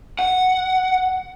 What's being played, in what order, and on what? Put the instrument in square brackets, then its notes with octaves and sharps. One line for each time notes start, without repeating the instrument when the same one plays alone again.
[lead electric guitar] F#5